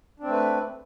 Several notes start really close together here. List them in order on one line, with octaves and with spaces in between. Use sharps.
D4 C4 A3 B4